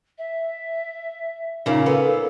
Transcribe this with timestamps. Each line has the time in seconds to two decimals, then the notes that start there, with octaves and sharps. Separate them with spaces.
0.18 E5
1.66 A#2 C#3 D#4
1.86 B3 A4